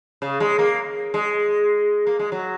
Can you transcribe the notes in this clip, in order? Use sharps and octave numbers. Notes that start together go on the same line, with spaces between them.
C#3
G#3
A#3
G#3
A#3
G#3
F#3